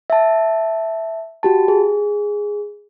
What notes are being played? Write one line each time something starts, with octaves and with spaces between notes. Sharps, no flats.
E5 A5
F#4 G4 A5
G#4